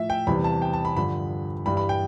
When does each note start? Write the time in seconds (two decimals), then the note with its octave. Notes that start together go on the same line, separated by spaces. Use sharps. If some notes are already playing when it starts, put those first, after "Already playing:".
Already playing: A2 F3 E5
0.10 G5
0.27 E2 C3 E3 G3 B5
0.44 A5
0.62 G5
0.73 A5
0.85 B5
0.97 G2 D3 F3 B5
1.66 G2 E3 G3 B5
1.77 B5
1.89 G5